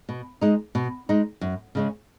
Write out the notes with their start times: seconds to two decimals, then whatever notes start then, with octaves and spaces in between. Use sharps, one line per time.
0.09 B2
0.41 G#3 D#4
0.75 B2
1.09 G#3 D#4
1.41 F#2
1.75 C#3 G#3 C#4